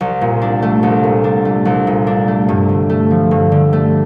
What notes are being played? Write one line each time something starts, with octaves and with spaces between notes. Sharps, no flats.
C2
A#2
D4
A3
C2
A#2
D4
A3
C2
A#2
D4
A3
G2
D3
A3
F3
G2
D3
A3